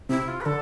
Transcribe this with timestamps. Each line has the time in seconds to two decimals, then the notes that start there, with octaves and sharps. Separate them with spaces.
0.09 C3 E4
0.28 F4
0.41 B4
0.45 D3 A4